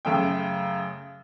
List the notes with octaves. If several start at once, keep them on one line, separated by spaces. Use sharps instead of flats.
F#2 C#3 A3 G5